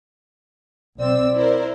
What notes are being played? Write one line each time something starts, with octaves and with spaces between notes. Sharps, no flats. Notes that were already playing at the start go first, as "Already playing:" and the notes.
B1 C4 D5 E6
E4 A#4 C5